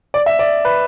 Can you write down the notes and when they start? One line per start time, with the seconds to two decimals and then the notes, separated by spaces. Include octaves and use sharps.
0.14 D5
0.26 E5
0.39 D5
0.65 B4